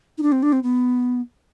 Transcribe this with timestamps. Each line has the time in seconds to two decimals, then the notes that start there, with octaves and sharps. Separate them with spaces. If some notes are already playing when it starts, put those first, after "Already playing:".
0.18 D#4
0.22 D4
0.32 C4
0.42 D4
0.52 C4
0.63 B3